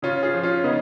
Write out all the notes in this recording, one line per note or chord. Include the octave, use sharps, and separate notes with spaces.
C#3 C#4 F4
F4 G#4
F3
C#4 F4
C#3 B3 D#4